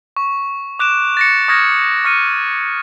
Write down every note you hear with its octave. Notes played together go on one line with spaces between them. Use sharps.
C#6
D6 F#6 D7 E7
A6 A#6 C#7
C#6 D#6 F6 G#6 A#6
C#6 F6 A#6 C#7 D#7